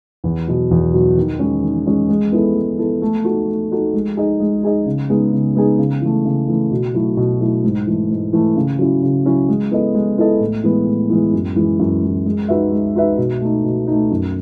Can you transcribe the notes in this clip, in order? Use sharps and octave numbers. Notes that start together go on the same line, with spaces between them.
E2
B2 F#3
E2
B2 F#3
D#3
G#3 C#4
D#3
G#3 C#4
G#3
B3 E4 A4
G#3
B3 E4 A4
A3
D#4 F#4 A4
A3
D#4 F#4 A4
G#3
D#4 G#4 D#5
G#3
D#4 G#4 D#5
C#3
G#3 B3 D#4 G#4
C#3
G#3 B3 D#4 G#4
C#3
E3 A3
C#3
E3 A3
B2
F#3 A3 E4
B2
F#3 A3 E4
G#2
E3 A3
G#2
E3 A3
C#3
F#3 C#4 E4
C#3
F#3 C#4 E4
G#3
B3 E4 A4 D#5
G#3
B3 E4 A4 D#5
A2
E3 G#3 B3
A2
E3 G#3 B3
F#2
E3 G#3
F#2
E3 G#3
G#3
D#4 F#4 B4 E5
G#3
D#4 F#4 B4 E5
B2
A3 D#4
B2
A3 D#4
F#2